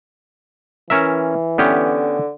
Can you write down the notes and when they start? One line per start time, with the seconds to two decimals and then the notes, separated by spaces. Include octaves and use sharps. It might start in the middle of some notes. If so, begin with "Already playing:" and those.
0.90 E3 C#4 A#4 E5
1.58 D3 B3 C#4 G4